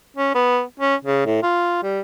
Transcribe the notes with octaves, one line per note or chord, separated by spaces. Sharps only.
C#4
B3
C#4
C#3
A2
F4
G3